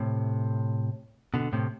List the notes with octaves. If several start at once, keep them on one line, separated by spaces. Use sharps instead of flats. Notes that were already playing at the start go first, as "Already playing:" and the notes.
Already playing: A2 C3
B2 D3
A2 C3